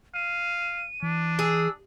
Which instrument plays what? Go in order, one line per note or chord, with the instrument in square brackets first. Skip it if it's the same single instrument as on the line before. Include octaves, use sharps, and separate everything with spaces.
[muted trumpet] F5 [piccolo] D#7
[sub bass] E3 [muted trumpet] D4
[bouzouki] G#4 [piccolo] E6